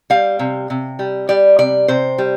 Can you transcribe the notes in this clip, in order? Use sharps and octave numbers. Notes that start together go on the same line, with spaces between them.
G3 F5
C3
C3
G3
G3 D5
C3 D5
C3 C5
G3